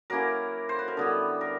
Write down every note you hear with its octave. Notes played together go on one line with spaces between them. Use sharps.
F#3 A#3 C#4 E4 A#4
C5
B4
A#4
D3 G3 B3 E4 A4
A#4